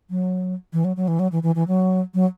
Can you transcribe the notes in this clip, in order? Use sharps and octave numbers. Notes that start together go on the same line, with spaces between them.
F#3
E3
F#3
F#3
E3
F#3
E3
E3
E3
F#3
F#3